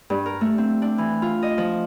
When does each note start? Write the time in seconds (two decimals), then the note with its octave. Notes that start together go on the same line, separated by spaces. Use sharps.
0.10 G2
0.26 A#4
0.41 A3
0.58 C4
0.82 D4
0.98 E3
1.22 F4
1.42 D#5
1.58 F3